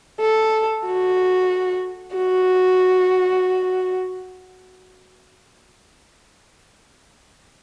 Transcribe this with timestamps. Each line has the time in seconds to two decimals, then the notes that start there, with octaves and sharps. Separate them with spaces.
0.21 A4
0.87 F#4
2.15 F#4